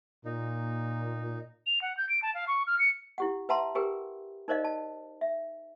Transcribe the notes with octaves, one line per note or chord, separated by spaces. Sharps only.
A#2 D#4
F7
F#5
G6
D7
A5
F5
C#6
F6
C#7
E4 G4 F#5
B4 E5 F#5 A5 A#5 C6
G4 G#4 A#4 B4 G5
D#4 A#4 C5 D5 D#5 F5
A5
E5